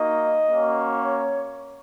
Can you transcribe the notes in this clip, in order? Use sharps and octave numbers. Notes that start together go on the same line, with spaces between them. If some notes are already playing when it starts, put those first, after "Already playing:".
Already playing: A#3 D#4 F#4 D#5
A#3 C#4 F#4
C#5